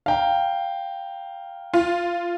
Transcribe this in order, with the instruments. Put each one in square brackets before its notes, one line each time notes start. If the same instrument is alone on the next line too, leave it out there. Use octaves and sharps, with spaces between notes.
[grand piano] F5 G5 A#5
[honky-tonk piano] F4